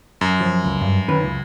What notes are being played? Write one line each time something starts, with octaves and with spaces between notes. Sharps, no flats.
F#2
F3
C#2
G2
D#3 C#4 B4
C#2